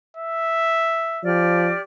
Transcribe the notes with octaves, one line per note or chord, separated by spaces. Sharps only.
E5
F3 G4 D5 F6